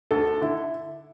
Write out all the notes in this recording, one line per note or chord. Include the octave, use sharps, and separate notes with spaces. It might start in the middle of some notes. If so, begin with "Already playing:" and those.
D2 A4
D3 E4